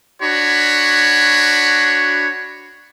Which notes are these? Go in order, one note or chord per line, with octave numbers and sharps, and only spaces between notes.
D4 F#4 C#5 B5